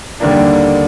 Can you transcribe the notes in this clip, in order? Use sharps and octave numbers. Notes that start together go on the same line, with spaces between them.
D#2 D3 G3 A#3 D4